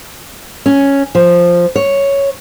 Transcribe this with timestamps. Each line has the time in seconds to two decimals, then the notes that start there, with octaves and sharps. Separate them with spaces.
0.66 C#4
1.15 F3
1.76 C#5